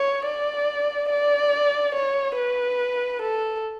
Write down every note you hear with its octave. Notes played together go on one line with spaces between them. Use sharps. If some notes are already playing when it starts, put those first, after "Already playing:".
Already playing: C#5
D5
D5
C#5
B4
A4